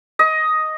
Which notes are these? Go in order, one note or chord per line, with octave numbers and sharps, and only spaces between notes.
D#5